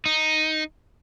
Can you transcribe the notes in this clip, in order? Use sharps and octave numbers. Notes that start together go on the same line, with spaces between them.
D#4